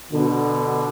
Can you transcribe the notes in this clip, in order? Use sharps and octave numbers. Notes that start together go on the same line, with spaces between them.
B2 D3